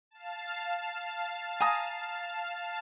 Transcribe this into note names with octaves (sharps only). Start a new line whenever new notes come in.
F5 A5
G#5 A#5 D#6